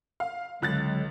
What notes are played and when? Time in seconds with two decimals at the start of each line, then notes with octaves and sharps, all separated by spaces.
0.20 F5
0.62 C#2 D3 F#3 G#3 F#6 A6